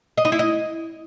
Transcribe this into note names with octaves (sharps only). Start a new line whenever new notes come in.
D#5
D#4
E4
D#5